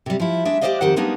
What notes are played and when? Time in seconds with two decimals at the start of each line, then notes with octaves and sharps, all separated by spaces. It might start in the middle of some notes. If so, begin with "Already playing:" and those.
0.06 C3 G3
0.20 F3 E4
0.45 G#3 D4 E5
0.61 G4 A4 C5 D5 D#5 F5
0.81 F2 D#3 G4 C5 F#5
0.96 G3 G#3 A#3 B3 D4 D#4